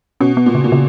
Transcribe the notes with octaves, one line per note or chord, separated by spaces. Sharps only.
B2 C#4
B3
A#2
C#3
A#2
C#3